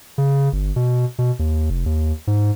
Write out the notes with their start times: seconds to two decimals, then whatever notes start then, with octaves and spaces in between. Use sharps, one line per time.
0.18 C#3
0.53 G1
0.76 B2
1.18 B2
1.39 D#2
1.70 F1
1.86 D#2
2.27 G#2